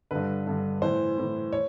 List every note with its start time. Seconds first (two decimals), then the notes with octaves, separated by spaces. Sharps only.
0.11 G2 D3 B4
0.47 G2 D3
0.82 A2 E3 C5
1.18 A2 E3
1.53 C#5